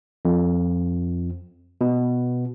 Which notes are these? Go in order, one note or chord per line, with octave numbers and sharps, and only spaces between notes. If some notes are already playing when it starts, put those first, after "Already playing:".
F2
B2